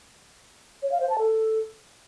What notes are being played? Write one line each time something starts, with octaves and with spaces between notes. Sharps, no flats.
C#5
F5
C5
A5
A4